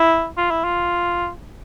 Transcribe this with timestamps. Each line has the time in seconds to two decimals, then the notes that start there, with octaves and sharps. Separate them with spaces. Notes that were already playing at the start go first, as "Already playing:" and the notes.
Already playing: E4
0.37 F4
0.51 E4
0.64 F4